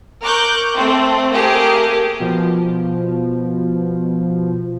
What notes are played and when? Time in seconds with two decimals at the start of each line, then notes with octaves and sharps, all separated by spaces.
0.22 A#4 C#6 D6 F#6 G6
0.75 A3 C4
1.33 A3 A#3 G4 G#4 A#4
2.19 B2 F3